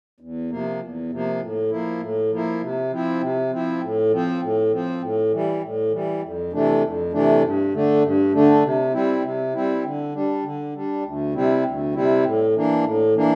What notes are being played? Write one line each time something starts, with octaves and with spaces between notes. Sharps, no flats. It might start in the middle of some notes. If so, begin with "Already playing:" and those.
E2
C3 F3 A#3
E2
C3 F3 A#3
A2
F3 A#3 E4
A2
F3 A#3 E4
C3
F3 C4 E4
C3
F3 C4 E4
A2
F3 C4
A2
F3 C4
A2
E3 G3
A2
E3 G3
F2
C3 E3 A3 D4
F2
C3 E3 A3 D4
G2
D3 A3 D4
G2
D3 A3 D4
C3
G3 C4 E4
C3
G3 C4 E4
D3
G3 D4
D3
G3 D4
D2
C3 G3 C4 E4
D2
C3 G3 C4 E4
A2
E3 A#3 D4
A2
E3 A#3 D4